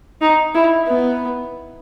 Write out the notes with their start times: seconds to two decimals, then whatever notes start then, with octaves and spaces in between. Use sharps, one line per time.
0.21 D#4
0.55 E4
0.87 B3